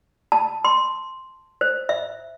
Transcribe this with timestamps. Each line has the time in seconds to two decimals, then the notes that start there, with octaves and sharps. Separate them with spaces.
0.32 A5
0.65 C6
1.61 C5
1.89 E5